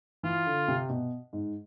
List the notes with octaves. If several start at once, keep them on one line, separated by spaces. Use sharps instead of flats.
E3 F4
D3
C3
B2
G#2